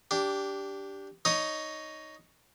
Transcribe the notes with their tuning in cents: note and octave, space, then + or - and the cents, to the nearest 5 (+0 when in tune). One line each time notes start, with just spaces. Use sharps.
D4 -15 G4 +0
D#4 +0 C#5 +10 D#6 +0